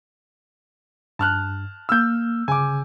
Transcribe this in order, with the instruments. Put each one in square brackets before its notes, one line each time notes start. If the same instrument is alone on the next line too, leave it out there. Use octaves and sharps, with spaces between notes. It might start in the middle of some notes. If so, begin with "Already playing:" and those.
[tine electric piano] G2 [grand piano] A5 F6 F#6
[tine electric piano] A#3 F6 [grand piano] E6 G6
[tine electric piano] G1 C#3 [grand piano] G#5 D6